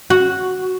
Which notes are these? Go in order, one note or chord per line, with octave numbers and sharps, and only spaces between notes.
F#4